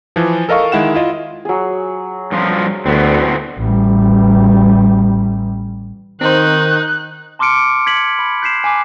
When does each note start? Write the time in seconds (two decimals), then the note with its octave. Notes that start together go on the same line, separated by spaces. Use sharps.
0.16 E3 F3
0.49 A4 A#4 D#5 F5 C#6
0.72 D#3 G#3 E4 F#5 E7
0.94 E4 F4 D#5
1.45 F#3 G#4
2.32 G2 F3 F4
2.86 D2 A2 B3 C4
3.59 A1 G3
6.21 D#3 C4 D#4 C5 F#6
7.39 A5 C6 D6 F6 C#7 D7
7.87 G#6 B6 C#7 F#7
8.19 B5
8.42 F#6 G6 B6 C7 E7
8.64 G#5 D6